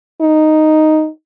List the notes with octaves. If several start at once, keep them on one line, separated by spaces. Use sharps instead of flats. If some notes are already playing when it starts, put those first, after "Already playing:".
D#4